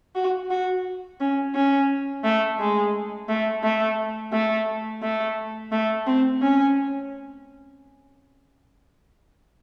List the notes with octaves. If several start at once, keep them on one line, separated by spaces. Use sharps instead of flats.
F#4
F#4
C#4
C#4
A3
G#3
A3
A3
A3
A3
A3
C4
C#4